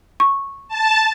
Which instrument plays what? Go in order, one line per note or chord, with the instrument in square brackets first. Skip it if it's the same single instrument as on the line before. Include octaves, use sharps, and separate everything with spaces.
[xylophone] C#6
[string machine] A5